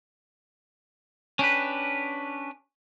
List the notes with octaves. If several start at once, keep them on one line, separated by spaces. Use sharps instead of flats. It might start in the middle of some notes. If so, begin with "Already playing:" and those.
C#4 D4 G4 B4